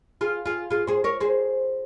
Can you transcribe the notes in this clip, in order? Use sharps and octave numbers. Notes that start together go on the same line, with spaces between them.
F4 G#4
F4 G#4
F4 G#4
G#4 C5
A#4 C#5
G#4 C5